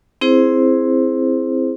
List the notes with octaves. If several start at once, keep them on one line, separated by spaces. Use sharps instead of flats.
C4 E4 G#4 C5